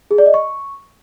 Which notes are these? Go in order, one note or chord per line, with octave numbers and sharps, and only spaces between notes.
G#4
D5
D#5
C#6